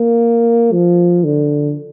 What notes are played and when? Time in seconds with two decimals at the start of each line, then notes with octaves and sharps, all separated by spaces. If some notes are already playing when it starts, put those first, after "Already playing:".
Already playing: A#3
0.72 F3
1.24 D3